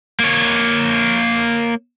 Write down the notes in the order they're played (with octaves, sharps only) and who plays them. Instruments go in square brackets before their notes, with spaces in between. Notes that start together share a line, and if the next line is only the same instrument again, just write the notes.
[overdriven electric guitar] A#3 C#5